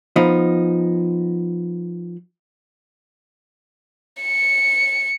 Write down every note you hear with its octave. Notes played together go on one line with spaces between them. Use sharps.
F3 B3 D#4
C#7